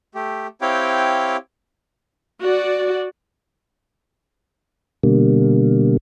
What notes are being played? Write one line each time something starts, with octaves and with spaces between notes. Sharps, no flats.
A3 G4
C4 E4 G4 C#5 F5 G5
F#4 D5
B2 D3 G3 A#3